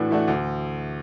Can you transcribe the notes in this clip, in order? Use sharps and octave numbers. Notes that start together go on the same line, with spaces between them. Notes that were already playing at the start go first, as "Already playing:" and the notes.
Already playing: A2 E3 A3 D4 F#4
E3 A3 D4 F#4
D2